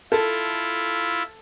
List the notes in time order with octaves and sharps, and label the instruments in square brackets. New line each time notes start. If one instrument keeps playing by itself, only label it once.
[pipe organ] E4 F4 [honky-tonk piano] A4